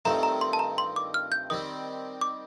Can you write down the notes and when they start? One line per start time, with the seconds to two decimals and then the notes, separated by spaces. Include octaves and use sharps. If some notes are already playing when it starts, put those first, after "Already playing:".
0.05 G2 D#3 A3 C4 F4 A#5
0.23 A#5
0.41 C6
0.53 A5
0.59 A#5
0.78 C6
0.96 D6
1.14 F6
1.32 G6
1.50 D#3 G3 C4 D#6
2.21 D6